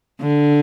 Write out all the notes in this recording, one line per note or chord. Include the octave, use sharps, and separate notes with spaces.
D3